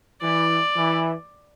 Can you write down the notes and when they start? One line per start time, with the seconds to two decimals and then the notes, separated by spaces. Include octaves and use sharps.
0.22 E3 D5
0.76 E3